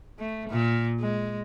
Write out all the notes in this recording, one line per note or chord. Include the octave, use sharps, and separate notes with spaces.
A3
A#2
G#3